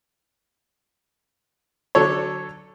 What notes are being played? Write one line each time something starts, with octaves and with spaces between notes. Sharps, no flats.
D3 F#3 A4 C#5